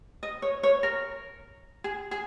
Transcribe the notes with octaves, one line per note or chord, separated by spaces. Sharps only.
D#5
C#5
C#5
A#4
G#4
G#4